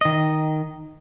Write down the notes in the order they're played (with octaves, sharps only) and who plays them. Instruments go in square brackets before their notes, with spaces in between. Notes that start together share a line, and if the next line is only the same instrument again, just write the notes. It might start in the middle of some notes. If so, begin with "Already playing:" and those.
[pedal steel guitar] D#3 D#5